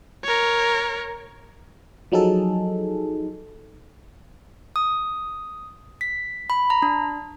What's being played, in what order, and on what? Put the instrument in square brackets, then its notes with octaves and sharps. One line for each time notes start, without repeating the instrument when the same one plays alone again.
[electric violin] A#4 C#5
[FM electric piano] F3 F#3 D#4 G#4 A4
[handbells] D#6
B6
B5
A#5
D4